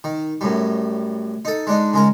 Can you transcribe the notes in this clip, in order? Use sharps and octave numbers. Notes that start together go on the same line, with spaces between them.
D#3
F#2 A2 G3
D#4 A4
G#3 D4 D#4
C#3 G#3 A#4